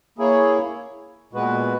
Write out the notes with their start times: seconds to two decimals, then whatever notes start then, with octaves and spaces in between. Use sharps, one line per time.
0.18 A#3 E4 G#4 C#5
1.33 A#2 G#3 B3 F#4 B4